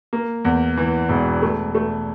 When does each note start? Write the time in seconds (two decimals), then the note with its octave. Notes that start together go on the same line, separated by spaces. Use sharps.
0.13 A#3
0.45 E2
0.77 E3
1.09 E1
1.42 A3
1.75 A3